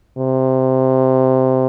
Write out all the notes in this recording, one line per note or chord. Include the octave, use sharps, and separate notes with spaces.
C3